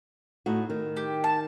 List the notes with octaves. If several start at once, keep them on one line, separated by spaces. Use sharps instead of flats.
A2 D#4 F#4
D#3
G4
A5